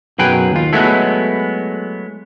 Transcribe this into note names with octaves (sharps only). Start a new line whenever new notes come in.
B1 F#2 F#3 G#4 B4 G5
D#2 F4
F#3 G#3 A3 B3 E4 A4